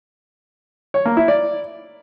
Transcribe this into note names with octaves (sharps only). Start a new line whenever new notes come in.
C#5
A#3
E4
D5